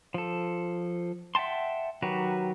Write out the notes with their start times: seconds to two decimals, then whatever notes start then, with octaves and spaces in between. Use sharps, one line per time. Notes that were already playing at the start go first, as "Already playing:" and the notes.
0.14 F3 A4
1.35 E5 F#5 G5 A5 C6
2.02 D#3 F#3 F#4 G4 B4